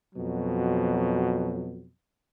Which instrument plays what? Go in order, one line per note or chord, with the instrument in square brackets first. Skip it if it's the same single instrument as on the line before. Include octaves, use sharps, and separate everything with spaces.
[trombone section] F2 B2 F#3